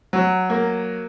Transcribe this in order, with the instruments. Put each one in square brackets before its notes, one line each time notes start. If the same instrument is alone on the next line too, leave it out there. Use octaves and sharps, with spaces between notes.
[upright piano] F#3
A#3